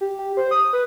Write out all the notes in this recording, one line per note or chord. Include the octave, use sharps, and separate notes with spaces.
G4
G4
C5
D#6
B4